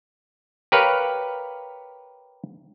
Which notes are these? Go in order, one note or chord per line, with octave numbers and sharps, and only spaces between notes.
G4 A#4 B4 C#5 F5